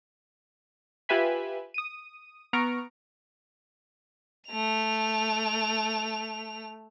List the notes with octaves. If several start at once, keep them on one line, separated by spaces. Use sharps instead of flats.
F4 G4 B4 E5 G#5 B5
D#6 D#7
B3 A#5 C#6 F6 D7
A3 F7